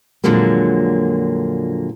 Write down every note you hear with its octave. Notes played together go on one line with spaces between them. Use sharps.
F2 A#2 D3 F#3 G#3 A#3